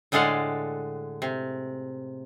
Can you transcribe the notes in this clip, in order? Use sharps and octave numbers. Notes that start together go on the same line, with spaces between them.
A2 D3 G#3 A4 F5 F#5
C3